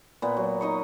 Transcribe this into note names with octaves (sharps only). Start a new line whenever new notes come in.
A#2 B3
F#3
D#4 D#5 C#6